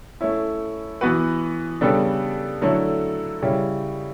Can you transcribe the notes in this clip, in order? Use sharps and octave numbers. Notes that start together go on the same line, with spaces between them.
A3 C#4 E4
E3 B3 F#4 B4
C#3 G3 B3 D4 A4
D3 F#3 A3 E4 A4
C#3 G3 C#4 E4